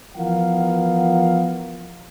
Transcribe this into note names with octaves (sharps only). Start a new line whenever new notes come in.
E3 F3 B3 A#4 F5 F#5